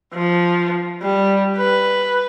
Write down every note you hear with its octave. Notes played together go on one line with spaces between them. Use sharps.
F3
G3
B4